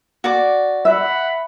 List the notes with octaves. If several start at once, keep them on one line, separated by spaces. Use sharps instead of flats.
F#4 D5 D6
E5 F#5 B5